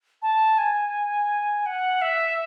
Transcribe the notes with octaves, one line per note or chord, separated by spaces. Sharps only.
A5
G#5
F#5
E5